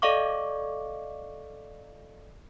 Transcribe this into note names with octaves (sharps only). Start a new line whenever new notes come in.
A4 D5 D#5 F5 C#6 D6